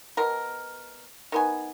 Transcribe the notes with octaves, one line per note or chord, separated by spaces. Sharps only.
B2 A#4
D#3 B3 G#5